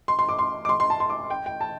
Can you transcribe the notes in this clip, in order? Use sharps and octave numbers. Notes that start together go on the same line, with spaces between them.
C6
C6
D6
C6
D6
C6
C6
A5
C6
D6
G5
G5
A5